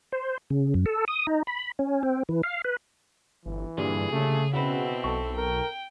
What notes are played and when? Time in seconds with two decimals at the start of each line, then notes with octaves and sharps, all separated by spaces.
0.12 C5
0.50 C#3
0.74 F#2
0.86 A4
1.08 D#6
1.27 D#4
1.47 B5
1.79 C#4
2.03 C4
2.29 E3
2.43 F5
2.64 B4
3.46 G1 E3
3.77 G2 A#2 D3 G3 G#4
4.12 C#3 A3
4.53 B2 C4 E4 F#4 B4
5.04 B1 A4 C#6
5.36 A#4 G5